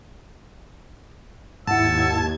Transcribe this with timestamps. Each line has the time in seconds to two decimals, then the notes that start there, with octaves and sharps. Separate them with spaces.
1.67 D#2 G#2 E4 F#5 A5 E6 G#6